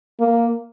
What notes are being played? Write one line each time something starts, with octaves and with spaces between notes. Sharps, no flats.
A#3